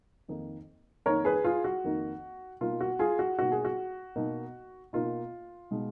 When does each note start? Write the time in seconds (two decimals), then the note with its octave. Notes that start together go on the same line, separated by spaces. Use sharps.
0.28 F2 D#3 A#3 D#4
1.06 F2 D#3 A#3 D#4 A#4 C#5
1.25 G#4 B4
1.44 F4 G#4
1.64 F#4
1.84 F2 D#3 A#3 D#4
2.61 B2 A#3 D#4 F4
2.81 F#4
2.99 F4 G#4
3.19 F#4
3.38 B2 A#3 D#4 F#4
3.52 G#4
3.65 F#4
4.16 B2 A#3 D#4
4.93 B2 A#3 D#4 F4
5.71 B2 G#3 D#4